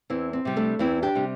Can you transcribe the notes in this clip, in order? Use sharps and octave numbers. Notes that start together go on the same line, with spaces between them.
E2 C4 E4
C4
C3 G3
A3 D4
E2 C4 E4
D4 G4
C3 G3